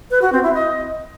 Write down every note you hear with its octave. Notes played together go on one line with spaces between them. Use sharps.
B4
F#4
C4
E4
D#5